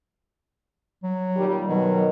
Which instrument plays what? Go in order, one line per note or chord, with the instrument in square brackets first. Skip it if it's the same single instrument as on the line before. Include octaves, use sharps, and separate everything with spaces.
[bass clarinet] F#3
[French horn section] A#2 D#3 G3
[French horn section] B2 D#3 [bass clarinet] F#3